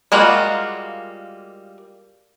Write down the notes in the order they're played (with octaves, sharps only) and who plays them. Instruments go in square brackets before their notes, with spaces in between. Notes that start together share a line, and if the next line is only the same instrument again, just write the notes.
[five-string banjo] G3 G#3 A#3 F4 F#4